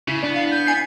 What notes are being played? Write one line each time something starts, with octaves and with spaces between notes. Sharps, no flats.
C#3 E4
B3 D4 D5
F5
G6
G#5 C7 C#7